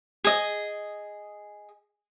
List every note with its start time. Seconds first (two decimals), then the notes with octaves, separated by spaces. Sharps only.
0.24 G#4 D#5